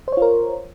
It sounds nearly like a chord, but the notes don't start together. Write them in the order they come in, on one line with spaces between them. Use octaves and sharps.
C5 C#5 F4 A#4